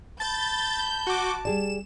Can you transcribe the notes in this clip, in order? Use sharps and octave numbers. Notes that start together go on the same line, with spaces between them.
A5 B5 G6 A6
F#4 D6
G3 G#4 D5 E7